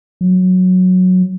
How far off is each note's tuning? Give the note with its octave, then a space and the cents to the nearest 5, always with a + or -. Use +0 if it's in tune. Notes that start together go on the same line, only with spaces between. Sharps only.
F#3 -10